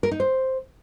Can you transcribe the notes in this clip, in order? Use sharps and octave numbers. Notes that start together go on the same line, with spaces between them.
A#4
D#4
C5